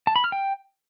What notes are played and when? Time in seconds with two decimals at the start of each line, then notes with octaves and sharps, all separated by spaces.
0.07 A5
0.16 B5
0.24 F6
0.32 G5